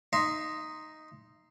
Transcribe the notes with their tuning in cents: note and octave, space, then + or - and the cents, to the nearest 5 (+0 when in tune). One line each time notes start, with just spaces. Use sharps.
D#4 +0 E5 +35 C6 +0